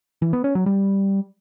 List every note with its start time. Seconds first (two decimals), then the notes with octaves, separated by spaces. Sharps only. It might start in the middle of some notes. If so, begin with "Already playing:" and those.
0.22 E3
0.33 B3
0.44 C#4
0.55 F#3
0.66 G3